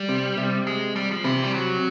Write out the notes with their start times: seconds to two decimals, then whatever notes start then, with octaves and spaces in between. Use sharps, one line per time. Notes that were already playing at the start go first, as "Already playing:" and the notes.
Already playing: G3
0.09 C3
0.37 C3
0.67 G#3
0.96 G3
1.11 F3
1.24 C3 E3
1.44 G3
1.54 F#3